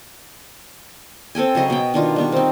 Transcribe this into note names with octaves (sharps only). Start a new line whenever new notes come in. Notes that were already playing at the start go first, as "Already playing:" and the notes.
C4 A4 G5 G#5
C#3 F#3 D#5 G#5
B2 G5
D#3 D4 F4
G3 B3 C#6
C4 D#4